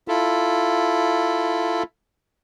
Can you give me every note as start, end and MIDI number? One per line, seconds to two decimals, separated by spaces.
0.08 1.83 64
0.08 1.83 65
0.08 1.83 69